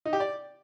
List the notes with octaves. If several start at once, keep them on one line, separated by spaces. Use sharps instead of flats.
D#4
G4
D5